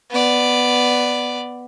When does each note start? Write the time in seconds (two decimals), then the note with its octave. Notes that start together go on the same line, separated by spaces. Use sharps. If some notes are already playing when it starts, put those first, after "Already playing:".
0.11 B3 D5